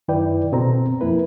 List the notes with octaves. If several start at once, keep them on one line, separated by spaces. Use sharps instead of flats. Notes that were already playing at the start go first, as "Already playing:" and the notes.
F#2 D#3 E4 B4 D5 G5
B2 C4 A4 A#5
F2 A#3 E4 B4